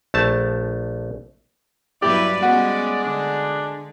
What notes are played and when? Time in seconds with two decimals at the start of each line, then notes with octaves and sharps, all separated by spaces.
0.14 A#1 A3 A5
2.02 G2 F#3 E4 G4 B4 D5
2.43 G3 G#3 B3 C#4 F#4
3.04 D3 D4